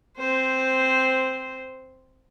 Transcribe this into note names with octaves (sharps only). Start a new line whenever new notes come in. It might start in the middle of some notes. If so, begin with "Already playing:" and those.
C4 C5